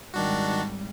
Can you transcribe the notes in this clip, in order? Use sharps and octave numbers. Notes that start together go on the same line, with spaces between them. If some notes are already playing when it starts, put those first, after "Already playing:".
G#1 D#3 G3 D4 F#4